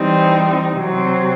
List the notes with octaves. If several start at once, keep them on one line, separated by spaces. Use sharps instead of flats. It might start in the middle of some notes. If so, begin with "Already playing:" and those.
Already playing: E3 G3 C4 D#4
C3 F#3 C4